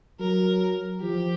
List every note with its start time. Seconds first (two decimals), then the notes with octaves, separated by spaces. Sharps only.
0.20 F#3 A#4
1.02 F3 G4